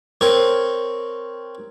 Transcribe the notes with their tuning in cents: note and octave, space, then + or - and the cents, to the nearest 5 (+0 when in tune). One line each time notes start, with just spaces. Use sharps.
C4 +0 A#4 +0 C#5 +0